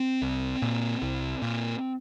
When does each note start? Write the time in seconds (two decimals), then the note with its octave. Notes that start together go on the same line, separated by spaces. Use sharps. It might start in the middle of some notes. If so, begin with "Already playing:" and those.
Already playing: C4
0.22 C2
0.62 A#2
1.02 C2
1.42 A#2